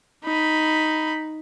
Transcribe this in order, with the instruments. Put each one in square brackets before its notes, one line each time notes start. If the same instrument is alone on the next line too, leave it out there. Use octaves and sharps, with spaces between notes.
[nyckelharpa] D#4 B5